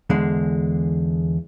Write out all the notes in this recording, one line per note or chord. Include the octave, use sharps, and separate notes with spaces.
E2 D3 G#3